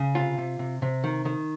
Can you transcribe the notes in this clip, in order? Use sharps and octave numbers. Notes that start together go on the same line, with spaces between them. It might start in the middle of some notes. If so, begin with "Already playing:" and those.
Already playing: C#3
C3 F4
C3
C3
C3
D#3
D#3